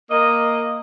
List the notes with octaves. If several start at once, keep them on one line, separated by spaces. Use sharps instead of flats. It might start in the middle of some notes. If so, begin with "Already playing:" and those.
A#3 D#5